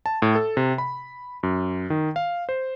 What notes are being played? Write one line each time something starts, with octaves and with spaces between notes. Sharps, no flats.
A5
A2
A4
C3
B5
F#2
D#3
F5
C5